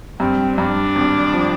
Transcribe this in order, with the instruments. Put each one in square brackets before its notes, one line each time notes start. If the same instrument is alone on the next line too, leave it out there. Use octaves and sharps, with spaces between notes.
[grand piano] G2 [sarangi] C4
[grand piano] G2 [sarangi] D4
[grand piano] G#1
F3